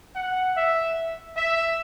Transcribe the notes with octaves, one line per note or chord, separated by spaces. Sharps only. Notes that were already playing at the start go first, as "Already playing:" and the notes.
F#5
E5
E5